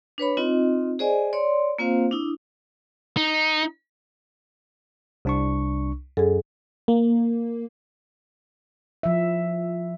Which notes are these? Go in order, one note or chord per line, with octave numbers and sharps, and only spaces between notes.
D4 B4 C#5 B5
C4 D#4 F4 D#5
G#4 C5 D5 D#5 G#5
C#5 D5 C6
A#3 C4 F4 C5 F5
D4 E4 D#6
D#4
C2 D4 C#6
F#2 G#4 A4
A#3
F3 E5